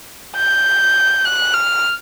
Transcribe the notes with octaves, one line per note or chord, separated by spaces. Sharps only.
G6
F#6
F6